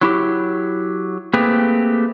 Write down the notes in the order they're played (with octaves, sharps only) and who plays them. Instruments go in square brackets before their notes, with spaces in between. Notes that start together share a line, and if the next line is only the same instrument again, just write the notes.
[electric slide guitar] F#3 E4 G4
A3 A#3 C4 G4 G#4 B4